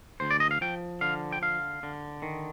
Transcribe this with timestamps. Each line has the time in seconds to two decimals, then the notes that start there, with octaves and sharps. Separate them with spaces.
0.20 D2 C5
0.31 D5
0.40 D#5
0.51 F5
0.61 F3 G5
1.01 D3 F5
1.32 G5
1.42 D3 F5
1.83 D3
2.22 D#3